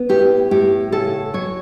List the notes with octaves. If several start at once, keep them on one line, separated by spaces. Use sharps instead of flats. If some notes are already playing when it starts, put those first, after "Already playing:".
Already playing: B3
A2 G4
A2 G4
C#3 A4
F#3 C#5